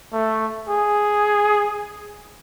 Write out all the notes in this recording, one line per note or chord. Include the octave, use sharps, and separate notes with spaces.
A3
G#4